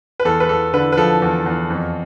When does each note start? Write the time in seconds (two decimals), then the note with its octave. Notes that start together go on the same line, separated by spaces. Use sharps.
0.20 B4
0.25 E2 A4
0.40 B4
0.49 E2 A4
0.74 D3 B4
0.92 B4
0.97 F3 A4
1.22 E2
1.46 E2
1.70 F2